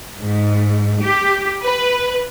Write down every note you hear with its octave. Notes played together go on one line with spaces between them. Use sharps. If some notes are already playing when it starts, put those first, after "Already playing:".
G#2
G4
B4